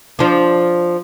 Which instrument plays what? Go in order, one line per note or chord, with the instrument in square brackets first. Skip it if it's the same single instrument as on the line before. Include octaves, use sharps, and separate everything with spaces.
[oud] F3 D4